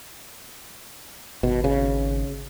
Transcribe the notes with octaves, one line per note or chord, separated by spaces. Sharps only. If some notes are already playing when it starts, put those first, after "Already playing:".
G#1 B2
C#3